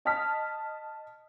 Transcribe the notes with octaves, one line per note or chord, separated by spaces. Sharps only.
D#5 A5 D#6 F6 B6